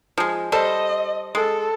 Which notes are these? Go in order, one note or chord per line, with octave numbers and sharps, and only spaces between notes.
F3 G#3
G3 A4 C5 D#5
G#3 A4